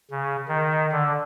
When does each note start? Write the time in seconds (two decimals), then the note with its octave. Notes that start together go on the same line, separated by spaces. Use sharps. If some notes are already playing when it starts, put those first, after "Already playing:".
0.11 C#3
0.48 D#3
0.92 D3